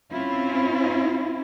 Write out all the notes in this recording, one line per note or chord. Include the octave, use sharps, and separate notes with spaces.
C4 C#4 E4 F4